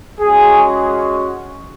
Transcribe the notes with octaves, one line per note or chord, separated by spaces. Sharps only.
G#3 C#4 F#4 G#4